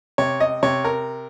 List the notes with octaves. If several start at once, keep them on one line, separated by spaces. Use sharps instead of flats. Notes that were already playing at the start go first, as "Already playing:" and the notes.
C3 C#5
D#5
C3 C#5
A#4